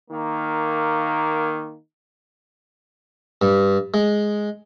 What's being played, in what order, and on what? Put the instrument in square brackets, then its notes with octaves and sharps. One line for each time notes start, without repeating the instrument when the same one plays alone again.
[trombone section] D#3 A#3
[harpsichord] G2
G#3